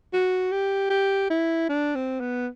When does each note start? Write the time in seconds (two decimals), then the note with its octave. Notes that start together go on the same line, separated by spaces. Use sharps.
0.13 F#4
0.52 G4
0.90 G4
1.30 E4
1.69 D4
1.95 C4
2.20 B3